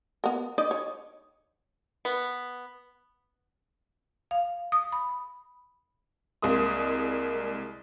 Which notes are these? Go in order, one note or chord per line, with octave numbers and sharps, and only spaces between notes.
B3 A#4
D#4 D5 D#5
C#5
B3
F5
D#6
B5
C2 G#3 A#3 D#6